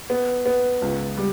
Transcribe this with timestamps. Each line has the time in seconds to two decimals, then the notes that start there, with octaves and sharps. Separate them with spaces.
0.10 B3
0.46 B3
0.82 C#2
1.17 G3